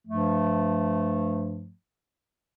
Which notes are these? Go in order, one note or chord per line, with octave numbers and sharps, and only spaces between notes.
G2 F3 A3